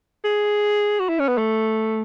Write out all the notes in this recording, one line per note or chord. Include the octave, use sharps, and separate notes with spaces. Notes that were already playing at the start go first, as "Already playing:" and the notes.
G#4
F#4
E4
C#4
B3
A3